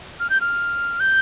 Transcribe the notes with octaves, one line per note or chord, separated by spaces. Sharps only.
F6
G6
F6
G6